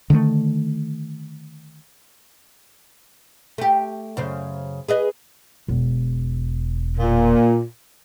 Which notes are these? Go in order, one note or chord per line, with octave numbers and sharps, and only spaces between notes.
D3 D#3 G#3 A3
A3 G4
F#2 C#3 C5
G#4 B4 D#5
E1
A#2